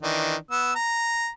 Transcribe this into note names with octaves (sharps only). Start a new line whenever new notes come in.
D#3 E3 D4
B3 E6
A#5